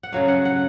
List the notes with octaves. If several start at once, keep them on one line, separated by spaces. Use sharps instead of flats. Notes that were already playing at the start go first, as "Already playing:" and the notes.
F#5
C#3 F#3 A3 F5
F#5
F#5